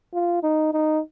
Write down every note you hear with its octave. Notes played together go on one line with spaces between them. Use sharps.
F4
D#4
D#4